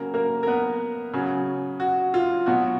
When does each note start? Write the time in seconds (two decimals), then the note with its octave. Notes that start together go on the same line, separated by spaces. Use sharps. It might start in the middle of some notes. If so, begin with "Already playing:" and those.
Already playing: C#3 F#3 A#3 C#4 A#4
0.14 A#3 A#4
0.43 A#4
0.47 B3 B4
1.13 C#3 F#3 C#4
1.80 F#4
2.14 F4
2.46 B2 F#3 B3 F#4